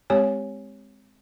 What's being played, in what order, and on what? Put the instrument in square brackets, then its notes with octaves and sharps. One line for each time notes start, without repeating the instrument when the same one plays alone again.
[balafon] G#3 C4 G4 C#5 G#5